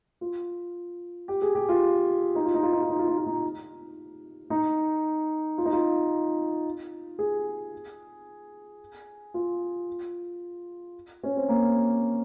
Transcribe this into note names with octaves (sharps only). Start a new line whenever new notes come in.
F4
G4
G#4
G4
F4
D#4
F4
D#4
F4
D#4
F4
D#4
F4
D#4
F4
D#4
D#4
F4
D#4
F4
G#4
F4
C#4
C4
A#3